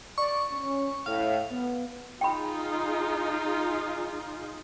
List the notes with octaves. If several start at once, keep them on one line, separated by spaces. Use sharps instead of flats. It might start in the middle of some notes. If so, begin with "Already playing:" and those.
D5 C#6
C#4
A2 F5
B3
D#4 F4 G#4 G5 B5